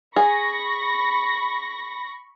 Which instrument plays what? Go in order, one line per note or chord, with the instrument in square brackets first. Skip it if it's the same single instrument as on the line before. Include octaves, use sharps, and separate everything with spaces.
[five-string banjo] G#4 [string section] B5 C#6 A#6